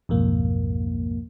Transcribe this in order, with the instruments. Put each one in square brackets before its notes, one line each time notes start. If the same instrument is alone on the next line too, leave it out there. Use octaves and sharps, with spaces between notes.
[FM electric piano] B1 F2 G#2 A#3